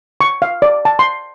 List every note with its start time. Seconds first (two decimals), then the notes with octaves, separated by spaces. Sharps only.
0.21 C#6
0.42 F5
0.62 D5
0.85 A5
0.99 C6